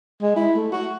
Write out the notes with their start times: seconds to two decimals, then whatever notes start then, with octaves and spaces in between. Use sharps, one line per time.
0.22 G#3
0.36 E4
0.55 A3
0.72 F#4